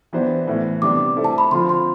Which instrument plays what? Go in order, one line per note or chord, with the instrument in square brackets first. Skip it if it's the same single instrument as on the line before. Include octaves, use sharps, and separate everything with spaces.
[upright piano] E3 B3 D4 G4 C5
A2 E3 B3
[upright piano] C3 G3 B3 D4 [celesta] D6
[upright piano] A3 E4 A4 C5
[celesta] A5
B5
[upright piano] D3 F3 C4 F4 [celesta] C6
[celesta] C6